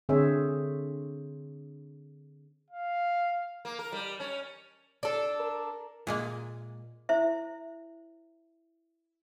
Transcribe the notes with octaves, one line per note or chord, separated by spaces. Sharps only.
D3 C4 G#4 C5 C#5 E5
F5
A#3
A#4
G3
C#4
D4 A4
A#4
A#2 G#3 A#3
E4 C5 E5